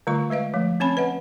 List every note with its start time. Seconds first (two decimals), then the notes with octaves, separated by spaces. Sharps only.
0.07 D3 G3 A3 F4 C#6
0.30 G#3 B4 D#5 F5
0.54 F3 A3
0.80 C4 C#4 C#5 G#5 A5 B5
0.97 B4 D#5 F#5